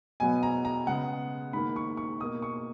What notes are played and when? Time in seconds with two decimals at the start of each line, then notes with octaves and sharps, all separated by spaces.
0.20 B2 F#3 B3 G#5
0.43 A#5
0.65 A#5
0.87 C#3 G#3 B3 F#5
1.53 G#2 D#3 A#3 B5
1.76 C#6
1.97 C#6
2.20 B2 A#3 D#6
2.42 C#6